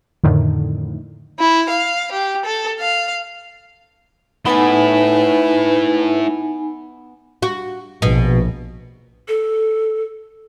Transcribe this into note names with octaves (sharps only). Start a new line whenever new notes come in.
F2 A2 D3 D#3
E4
F5
G4
A4
F5
A3 B3 D#4 E4 B4 G#5
F#4
A#1 B2
A4